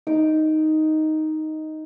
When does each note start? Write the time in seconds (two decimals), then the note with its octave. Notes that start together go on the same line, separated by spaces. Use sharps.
0.07 D#4 D6